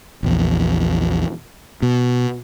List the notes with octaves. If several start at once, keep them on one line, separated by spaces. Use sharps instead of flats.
A#1 E2
B2